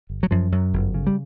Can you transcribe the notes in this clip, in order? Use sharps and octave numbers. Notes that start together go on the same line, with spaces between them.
G1
F#3
F#2 F3
F#2 F#3
G1
C#3
G3